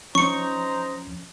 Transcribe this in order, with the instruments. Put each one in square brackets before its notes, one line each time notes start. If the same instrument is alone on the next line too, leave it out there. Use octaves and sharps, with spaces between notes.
[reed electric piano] F3 C#4 [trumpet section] D#4 C5 A#5 [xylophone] C#6 C#7